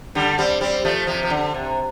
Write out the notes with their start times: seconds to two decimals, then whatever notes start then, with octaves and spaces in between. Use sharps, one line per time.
0.15 D3 G3
0.38 G3 C4
0.61 G3 C4
0.85 F3 A3
1.07 C3 F3
1.23 F3
1.30 D3
1.54 C3